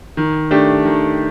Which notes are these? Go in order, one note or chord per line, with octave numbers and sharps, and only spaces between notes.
D#3
A3 D4 G4
D#3